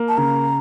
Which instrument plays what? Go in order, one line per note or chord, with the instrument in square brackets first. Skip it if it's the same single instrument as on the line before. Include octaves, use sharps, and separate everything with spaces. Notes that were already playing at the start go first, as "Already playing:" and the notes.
Already playing: [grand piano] A#3
[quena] A5
[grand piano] C#3 [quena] A#5